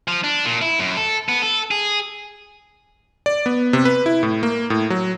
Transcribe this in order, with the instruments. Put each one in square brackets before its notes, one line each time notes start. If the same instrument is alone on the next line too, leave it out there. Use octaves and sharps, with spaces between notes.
[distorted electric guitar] F3
D4
A#2
E4
F#2
A4
B3
A4
G#4
[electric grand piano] D5
B3
C3
B4
E4
A2
A#3
A2
F#3